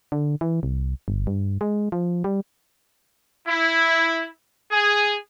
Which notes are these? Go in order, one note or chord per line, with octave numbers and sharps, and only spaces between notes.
D3
E3
C2
G1
G2
G#3
F3
G3
E4
G#4